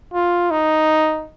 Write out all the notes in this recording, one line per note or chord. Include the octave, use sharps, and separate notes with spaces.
F4
D#4